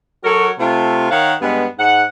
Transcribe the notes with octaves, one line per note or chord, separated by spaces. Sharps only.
F#3 F#4 A4 A#4 C#5
C3 A3 F4
D#3 A#4 C#5 F5 F#5
G2 G#3 B3
G#2 F#5